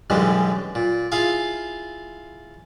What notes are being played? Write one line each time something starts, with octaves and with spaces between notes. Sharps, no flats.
B1 F#2 D3 E3 G3 G#3
A#2
E4 F4 G#4 F5 G#5